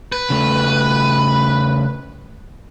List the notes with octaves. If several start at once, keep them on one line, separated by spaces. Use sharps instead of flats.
B4
C#3 A3